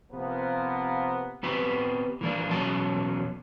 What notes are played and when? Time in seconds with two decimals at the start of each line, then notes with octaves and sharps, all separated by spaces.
0.12 C3 F3 A#3 B3
1.43 B3 C4 G4 B4
2.21 E3 A#3 D4
2.48 E2 B2 F#3 C#4 D#4 A5